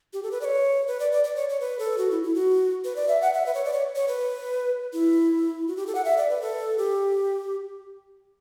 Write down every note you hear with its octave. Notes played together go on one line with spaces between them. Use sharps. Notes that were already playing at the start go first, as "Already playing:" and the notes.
G4
A4
B4
D5
C#5
B4
D5
D5
D5
C#5
C#5
B4
A4
F#4
E4
E4
F#4
B4
D5
E5
F#5
E5
B4
C#5
D5
C#5
C#5
B4
E4
F#4
G4
A4
F#5
E5
D5
B4
A4
G4